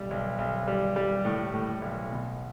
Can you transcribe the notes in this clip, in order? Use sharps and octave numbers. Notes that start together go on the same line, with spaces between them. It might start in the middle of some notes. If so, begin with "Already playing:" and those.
Already playing: B1 G3
B1
B1
G3
G3
A2
A2
B1
B2